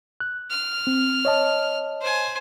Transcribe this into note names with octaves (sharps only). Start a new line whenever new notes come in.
F#6
F6
C4
C#5 D#5 A5
C5 G#5